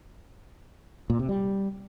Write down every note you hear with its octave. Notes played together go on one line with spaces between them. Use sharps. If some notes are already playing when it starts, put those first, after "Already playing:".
A#2
C3
G3